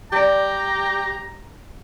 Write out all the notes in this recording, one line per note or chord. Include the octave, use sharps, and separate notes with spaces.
G3 G4 D5 A#5